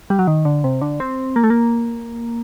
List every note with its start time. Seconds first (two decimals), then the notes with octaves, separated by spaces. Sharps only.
0.10 G3
0.19 F#3
0.27 D#3
0.45 D3
0.64 C3
0.81 D3
1.00 C4
1.36 A#3
1.44 A3
1.50 A#3